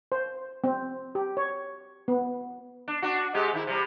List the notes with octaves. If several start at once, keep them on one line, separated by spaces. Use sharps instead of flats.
C5
C4
G4
C#5
B3
D4
D4 F#4
C3 G#3 G4
D#3 E4
C3 G3